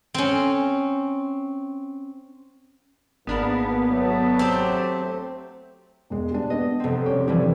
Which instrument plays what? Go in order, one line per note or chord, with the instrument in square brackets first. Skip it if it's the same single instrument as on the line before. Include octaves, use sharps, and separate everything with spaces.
[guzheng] C4 C#4
[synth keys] G#1 D4 A#4 [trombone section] G#2 A#3 [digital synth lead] B3
[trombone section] F#3 A3
[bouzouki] C4 G4
[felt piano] E1 G#3
G3 D4
[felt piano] B3 D4 [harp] D#5
[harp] F1 C4
[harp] G3 G4 [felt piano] C#4 C#5
[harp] E3 F3 G3 [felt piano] E4